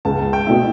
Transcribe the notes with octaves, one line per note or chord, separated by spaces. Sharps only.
C#2 A5
G5
B2 A3 E4